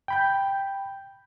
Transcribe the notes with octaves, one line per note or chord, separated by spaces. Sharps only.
G5 B5 G6